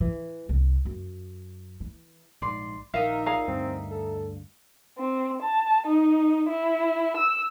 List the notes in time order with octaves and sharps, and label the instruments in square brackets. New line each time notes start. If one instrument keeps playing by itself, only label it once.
[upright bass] E3
C2
F#2
E3
[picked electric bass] A#1 G#2 [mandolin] D5 C6
[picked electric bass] A#1 [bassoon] D#3 [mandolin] D#4 A#4 E5 [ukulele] F5
[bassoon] A#2 [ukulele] G#4 F5 A#5
[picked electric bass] D2 G2 [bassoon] C4
[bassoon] A4
[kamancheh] C4
A5
D#4
E4
E6